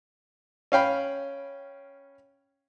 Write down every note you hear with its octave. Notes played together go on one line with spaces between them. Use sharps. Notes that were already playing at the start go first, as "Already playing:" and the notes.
C#4 F5 G5 B5